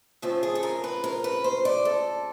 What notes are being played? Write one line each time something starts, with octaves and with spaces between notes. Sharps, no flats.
C#3 F3 A3 C4
G#4
A4
A#4
B4
A#4
B4
C5
D5
A4